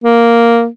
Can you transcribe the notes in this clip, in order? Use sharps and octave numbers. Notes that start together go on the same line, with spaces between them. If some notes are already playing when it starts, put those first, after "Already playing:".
A#3